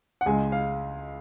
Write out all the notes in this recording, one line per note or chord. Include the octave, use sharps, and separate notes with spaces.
F#5
C#2 C#3 G#3 G#5
F5